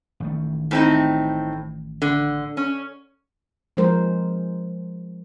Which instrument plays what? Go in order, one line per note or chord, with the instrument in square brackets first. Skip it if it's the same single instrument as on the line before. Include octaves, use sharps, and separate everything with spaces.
[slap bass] A1 D#3 A3
[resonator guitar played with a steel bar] A2 C4 D#4
D3
C#4
[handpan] F3 G#3 A#4 C5